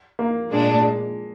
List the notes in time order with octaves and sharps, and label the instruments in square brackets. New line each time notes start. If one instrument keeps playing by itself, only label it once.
[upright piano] A#3
[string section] A#2 G#3 D4
[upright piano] G#3